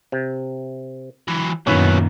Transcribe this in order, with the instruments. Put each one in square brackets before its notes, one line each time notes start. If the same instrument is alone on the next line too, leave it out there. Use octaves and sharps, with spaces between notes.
[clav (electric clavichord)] C3
[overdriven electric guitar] E3 F#3
[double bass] F#2 [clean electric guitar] A#2 D#3 [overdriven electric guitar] F#3 B3 [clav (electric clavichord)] C#4 E4 B4